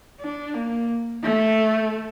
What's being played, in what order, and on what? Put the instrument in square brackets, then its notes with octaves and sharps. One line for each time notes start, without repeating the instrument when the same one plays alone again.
[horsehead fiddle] D4
A#3
A3